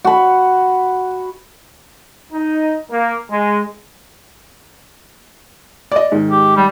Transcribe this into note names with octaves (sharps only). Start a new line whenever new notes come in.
F#4 B5
D#4
A#3
G#3
D5 D#5
G#2 D#3
G4
G3